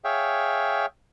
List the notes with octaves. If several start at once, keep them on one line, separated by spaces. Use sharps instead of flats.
G#4 C#5 E5 F5 G5